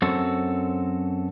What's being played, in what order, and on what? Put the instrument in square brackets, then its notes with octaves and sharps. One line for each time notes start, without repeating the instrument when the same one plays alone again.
[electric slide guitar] F#2 C4 F#4 A4